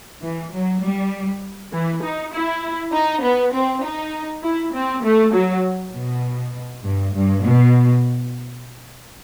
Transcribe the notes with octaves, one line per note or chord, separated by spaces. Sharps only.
E3
F#3
G3
E3
D#4
E4
D#4
B3
C4
D#4
E4
C4
A3
F#3
B2
G2
G2
B2